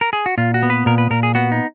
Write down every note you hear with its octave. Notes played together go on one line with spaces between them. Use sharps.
A#4
G#4
F#4
A#2 F4
F#4
B3
B4
A#2 A#4
B4
A#2 A#4
G#4
B3 F#4
D#4